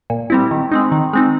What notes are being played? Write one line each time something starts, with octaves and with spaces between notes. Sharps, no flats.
A#2
G3 C4 E4
D#3
G#3 C4 D#4
D#3
G#3 C4 D#4